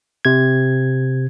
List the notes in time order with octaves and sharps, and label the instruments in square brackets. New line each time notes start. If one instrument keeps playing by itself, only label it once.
[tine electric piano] C3 G#6